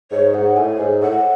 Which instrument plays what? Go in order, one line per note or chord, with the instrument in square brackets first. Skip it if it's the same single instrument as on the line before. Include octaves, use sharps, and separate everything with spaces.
[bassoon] G#2 [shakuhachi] C#5
[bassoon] G#2 [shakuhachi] F#5
[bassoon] A2 [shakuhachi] G#5
[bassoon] G#2
[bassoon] A2 [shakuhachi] F#5